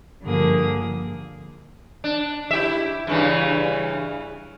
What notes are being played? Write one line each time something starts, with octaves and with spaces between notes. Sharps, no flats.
G2 D3 F3 A#3 G#4 D#6
D4
E4 G4 E5
G2 C#3 E3